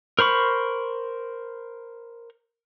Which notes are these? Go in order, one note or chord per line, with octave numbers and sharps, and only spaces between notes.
A#4 C5 B5 C#6